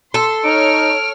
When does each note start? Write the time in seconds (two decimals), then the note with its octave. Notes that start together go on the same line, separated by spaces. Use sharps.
0.14 A4 C6
0.44 D#4 C#5 F6 D7